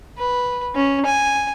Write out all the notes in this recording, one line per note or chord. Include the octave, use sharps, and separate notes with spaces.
B4
C#4
G#5